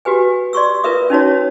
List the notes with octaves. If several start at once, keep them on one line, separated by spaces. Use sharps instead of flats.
F#4 G4 B4 G#5
D5 C6 C#6 E6
F4 A#4 B4 E5 D#6
C#4 D#4 F#4 C#5